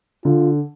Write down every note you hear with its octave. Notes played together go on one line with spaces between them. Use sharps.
D3 F4